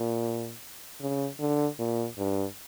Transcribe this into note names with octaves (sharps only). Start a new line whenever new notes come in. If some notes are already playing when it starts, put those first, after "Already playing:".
Already playing: A#2
C#3
D3
A#2
G2